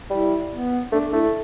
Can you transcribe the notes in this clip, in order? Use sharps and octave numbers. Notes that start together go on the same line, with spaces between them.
G3 E4
B3
A3 D4
A3 E4